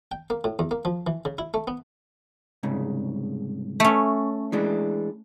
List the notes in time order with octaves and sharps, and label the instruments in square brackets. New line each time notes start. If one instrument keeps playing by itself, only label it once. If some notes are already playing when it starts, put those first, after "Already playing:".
[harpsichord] G5
A#3
A2
E2
A#3
F3
E3
C#3
E4
A3
B3
[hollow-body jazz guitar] C2 G#2 C#3
[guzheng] A3 C#4
[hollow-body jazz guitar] E3 G#3 D4